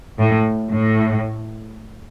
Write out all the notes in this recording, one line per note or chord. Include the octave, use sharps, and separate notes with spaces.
A2
A2